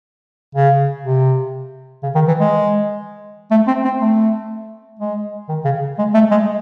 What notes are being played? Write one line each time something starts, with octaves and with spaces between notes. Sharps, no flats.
C#3
C3
C#3
D#3
E3
G#3
A3
C4
C4
A3
G#3
D#3
C#3
G#3
A3
G#3